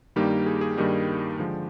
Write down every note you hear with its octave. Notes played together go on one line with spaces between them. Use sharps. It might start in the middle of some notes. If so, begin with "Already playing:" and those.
G2 D#3 G3 A#3 D#4 G4
G#4
G#4
G2 D#3 G3 A#3 D#4 G4
D3 F3 G#3